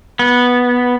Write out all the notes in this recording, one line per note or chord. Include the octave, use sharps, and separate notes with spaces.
B3